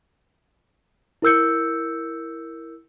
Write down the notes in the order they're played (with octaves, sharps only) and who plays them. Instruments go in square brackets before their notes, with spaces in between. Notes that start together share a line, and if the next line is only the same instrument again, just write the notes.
[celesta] E4 A#4 E6 G6 C#7